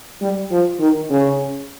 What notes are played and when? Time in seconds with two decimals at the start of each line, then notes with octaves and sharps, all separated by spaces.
0.22 G3
0.51 F3
0.80 D#3
1.10 C#3